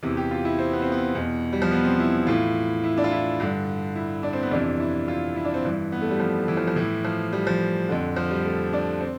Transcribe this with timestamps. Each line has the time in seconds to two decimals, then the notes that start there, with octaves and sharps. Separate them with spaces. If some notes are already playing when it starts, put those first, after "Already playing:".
0.03 E2 C3 E3
0.17 G4
0.31 F4
0.45 E4
0.59 C4
0.73 B3
0.82 C4
0.92 B3
1.15 E2 B2
1.53 G3
1.62 F3
1.71 B3
1.85 C4
2.00 E4
2.27 A2 E3 F4
2.84 E4
2.98 D4
3.04 F4
3.12 E4
3.40 G2 D3
3.96 E4
4.23 D4
4.33 C4
4.42 B3
4.51 F2 C3 E3 D4
4.80 E4
5.08 F4
5.36 E4
5.45 D4
5.54 C4
5.65 G2 E3
5.92 B3
6.01 A3
6.11 G3
6.20 F3
6.48 E3
6.57 F3
6.67 F3
6.76 A2 E3
7.05 F3
7.33 G3
7.47 F3
7.89 F2 D3
8.16 F3
8.31 G3
8.45 A3
8.73 D4
9.01 C4